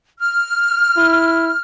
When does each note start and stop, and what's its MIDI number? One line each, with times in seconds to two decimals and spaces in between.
0.19 1.61 89
0.97 1.53 64